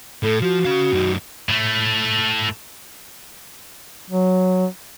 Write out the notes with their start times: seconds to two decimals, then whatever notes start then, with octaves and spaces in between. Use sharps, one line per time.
0.23 A2 A4
0.42 F3 F#4
0.65 C#4 F5
0.93 F#2 D#4
1.49 A2 A3
4.10 F#3